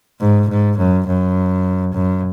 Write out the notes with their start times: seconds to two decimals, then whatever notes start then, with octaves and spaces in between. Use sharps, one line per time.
0.20 G#2
0.49 G#2
0.79 F#2
1.07 F#2
1.94 F#2